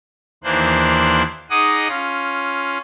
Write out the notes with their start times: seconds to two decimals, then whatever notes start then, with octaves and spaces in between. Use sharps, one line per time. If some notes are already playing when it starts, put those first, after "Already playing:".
0.44 D#2 E3 A#3 D4 C5 F#6
1.50 D#4 G#4 D#5 F#5 D6 D#6
1.88 C#4 F4